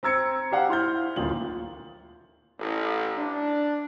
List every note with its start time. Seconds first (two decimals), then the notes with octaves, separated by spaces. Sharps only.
0.03 C4 A#5 E6 G#6 C#7
0.51 G4 C5 F5 F#5
0.69 E4 C6 F6 G6
1.16 D1 A1 D#2 F4 F#7
2.59 A1
3.18 D4